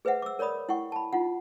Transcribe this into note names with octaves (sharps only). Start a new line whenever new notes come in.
G#4 B4 C5 E5 F#5
D6 E6
A#4 C#5 D5 B5 D#6
E4 F#5 G5 C#6
A5 B5
D#4 F4 F#5